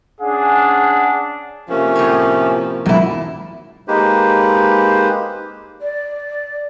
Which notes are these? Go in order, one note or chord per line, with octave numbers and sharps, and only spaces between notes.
C#4 D4 G#4 F#5
C3 F3 A3 A#3 C#4
A2 C#5
E1 B1 A#2 F#3 E4
G#3 A#3 D#4 G4 B4 C5
D5